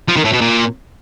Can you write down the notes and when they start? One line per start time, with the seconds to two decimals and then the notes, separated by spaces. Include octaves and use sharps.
0.08 F3
0.16 D#3
0.25 A2
0.33 B2
0.41 A#2